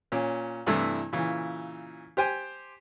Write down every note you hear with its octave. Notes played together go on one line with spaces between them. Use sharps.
A#2 C#4
G2 C3 E3 A3 D4 E4
A#2 C#3 E3
G4 C5 G5 G#5